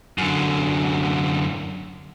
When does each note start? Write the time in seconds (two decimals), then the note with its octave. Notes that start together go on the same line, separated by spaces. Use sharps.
0.18 F#2 D3